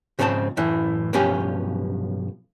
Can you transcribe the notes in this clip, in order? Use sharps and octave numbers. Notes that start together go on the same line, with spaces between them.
G#2 C#3 F3 C4 D#5 A5
F#2 A2 E3
B1 G2 F3 C#4 G4 G#5